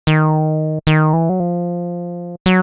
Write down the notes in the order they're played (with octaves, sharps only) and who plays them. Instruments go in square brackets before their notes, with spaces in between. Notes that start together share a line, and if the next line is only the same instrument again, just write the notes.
[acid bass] D#3
D#3
E3
F#3
F3
F#3